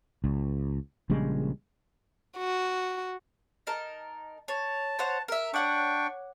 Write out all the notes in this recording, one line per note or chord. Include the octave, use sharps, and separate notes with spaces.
C#2
A#1 C#3 G3 G#3
F#4
D#4 A#4 A5
C#5 A5
C5 C#5 F#5
A#4 E5
D4 C#5 F#5 G5 C#6 D6